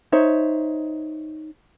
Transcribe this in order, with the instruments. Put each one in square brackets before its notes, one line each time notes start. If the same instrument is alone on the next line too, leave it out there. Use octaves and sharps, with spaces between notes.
[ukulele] D#4 C5 C#5 E5